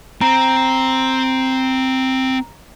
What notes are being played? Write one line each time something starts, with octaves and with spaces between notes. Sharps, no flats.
C4 A#5